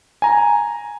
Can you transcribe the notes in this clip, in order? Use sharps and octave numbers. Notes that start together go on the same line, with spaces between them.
G#5 A#5